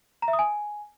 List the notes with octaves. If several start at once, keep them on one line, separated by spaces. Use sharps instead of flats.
A#5
E5
D#6
G#5